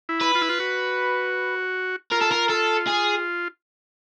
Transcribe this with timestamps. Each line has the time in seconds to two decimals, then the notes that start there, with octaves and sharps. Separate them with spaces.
0.09 E4
0.22 B4
0.35 F4
0.41 E4
0.49 F4
0.60 F#4
2.11 F4 A#4
2.21 A4
2.31 A#4
2.49 A4
2.87 G#4